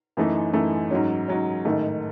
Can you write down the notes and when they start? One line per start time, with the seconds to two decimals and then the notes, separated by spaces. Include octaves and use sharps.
0.17 F#2 E3 A3 D#4
0.53 F#2 E3 A3 D#4
0.91 G#2 F#3 C#4
1.28 G#2 F#3 C#4
1.65 A1 G#2 D#3 A3